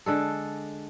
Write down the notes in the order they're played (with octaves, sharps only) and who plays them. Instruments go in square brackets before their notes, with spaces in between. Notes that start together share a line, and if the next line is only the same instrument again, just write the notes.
[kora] D3 G#3 A4